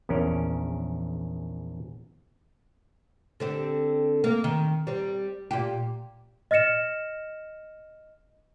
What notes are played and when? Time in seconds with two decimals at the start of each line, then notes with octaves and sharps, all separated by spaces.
0.09 A#1 E2 C#4 A#4
3.40 D3 C4 G4
4.24 A#3
4.44 D#3
4.87 G3 C4
5.51 A#2 G4
6.51 D#5 F6 A#6 C#7 E7